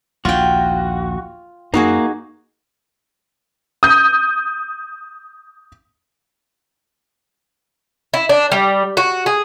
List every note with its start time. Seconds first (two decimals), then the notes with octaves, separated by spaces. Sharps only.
0.25 A#1 D#2 F4 F#4 G5
1.74 F#2 A#3 D#4 F#4 G#4
3.83 D#6 G6
8.14 E4
8.29 D4
8.52 G3
8.97 F#4
9.26 G#4